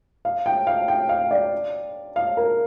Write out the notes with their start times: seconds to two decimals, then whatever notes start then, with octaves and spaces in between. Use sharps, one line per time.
0.25 F5
0.46 G5
0.67 F5
0.88 G5
1.09 F5
1.31 D5
2.16 F5
2.37 A#4